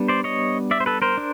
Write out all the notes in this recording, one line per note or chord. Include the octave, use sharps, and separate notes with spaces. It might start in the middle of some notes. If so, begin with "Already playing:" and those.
Already playing: G3 B3 D4
C5 D5
C#5 D#5
D5 E5
C5
A4 B4
A#4 C5
D4